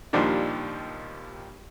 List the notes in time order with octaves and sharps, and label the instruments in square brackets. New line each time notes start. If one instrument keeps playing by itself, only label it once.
[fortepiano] D#2 A#2 F3 G3 D4 D#4